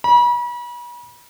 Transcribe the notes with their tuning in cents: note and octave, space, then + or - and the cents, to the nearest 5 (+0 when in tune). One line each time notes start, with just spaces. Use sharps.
B5 -40